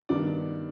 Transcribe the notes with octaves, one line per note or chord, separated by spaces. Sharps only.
G2 D#3 G3 B3 D4 D5